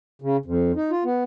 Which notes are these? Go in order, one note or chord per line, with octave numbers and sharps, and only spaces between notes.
C#3
F2
D#4
F4
B3